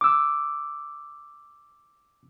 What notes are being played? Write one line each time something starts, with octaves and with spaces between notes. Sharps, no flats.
D6 E6